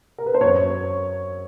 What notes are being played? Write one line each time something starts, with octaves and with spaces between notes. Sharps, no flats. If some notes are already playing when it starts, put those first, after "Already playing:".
A#4
B4
C5
F#2 C#5